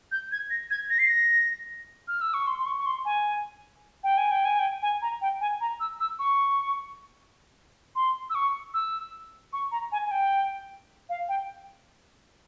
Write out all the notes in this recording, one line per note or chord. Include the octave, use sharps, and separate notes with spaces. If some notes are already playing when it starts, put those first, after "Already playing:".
G6
G#6
A#6
G#6
A#6
C7
A#6
F6
E6
C#6
C6
C6
C#6
C#6
C6
G#5
G5
G#5
G5
G#5
G5
G#5
A#5
G5
G#5
A#5
E6
E6
C#6
C6
E6
C#6
E6
C#6
A#5
G#5
G#5
G5
F5
G5